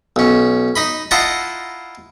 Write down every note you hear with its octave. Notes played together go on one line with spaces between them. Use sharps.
B1 C#4
D#4 D#5 B5
E4 F4 D#5 F#5 A5 A#5